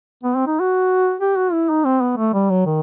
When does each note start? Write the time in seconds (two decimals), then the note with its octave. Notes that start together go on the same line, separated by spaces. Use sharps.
0.23 B3
0.35 C4
0.47 D#4
0.60 F#4
1.20 G4
1.36 F#4
1.53 E4
1.69 D#4
1.85 C4
2.01 B3
2.17 A3
2.33 G3
2.50 F#3
2.66 D#3